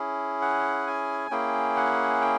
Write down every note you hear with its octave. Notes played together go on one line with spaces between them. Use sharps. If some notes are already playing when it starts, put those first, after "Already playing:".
Already playing: C#4 E4 G#4
F#5
G#5
A#3 C#4 E4 G#4 G5
F#5
G5